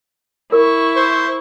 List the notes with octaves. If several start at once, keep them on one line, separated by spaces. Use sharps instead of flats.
E4 A#4 C#6
C5